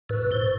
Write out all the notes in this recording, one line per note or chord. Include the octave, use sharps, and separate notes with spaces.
A2 B4
A2 C5